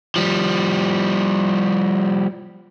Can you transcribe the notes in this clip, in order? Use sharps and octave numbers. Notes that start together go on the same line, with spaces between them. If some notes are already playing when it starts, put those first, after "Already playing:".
F3 G3